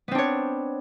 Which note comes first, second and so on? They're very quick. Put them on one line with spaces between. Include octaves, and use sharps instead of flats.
B3 C4 D4 C#5